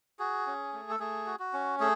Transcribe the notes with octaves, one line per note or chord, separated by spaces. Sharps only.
F#4 G#4
C#4
A3
A4
A3 G#4
F#4
F#4
C#4
A3 G#4